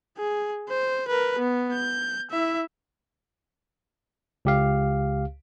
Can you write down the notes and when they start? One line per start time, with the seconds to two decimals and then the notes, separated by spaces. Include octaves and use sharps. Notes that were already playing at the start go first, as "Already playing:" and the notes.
0.18 G#4
0.69 C5
1.08 A#4 B4
1.39 B3
1.73 G6
2.31 E4 E5
4.45 C#2 G4 F5